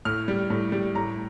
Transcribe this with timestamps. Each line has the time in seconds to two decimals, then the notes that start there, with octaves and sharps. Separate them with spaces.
0.05 A2 F6
0.28 G3
0.50 A2
0.72 G3
0.95 A2 A#5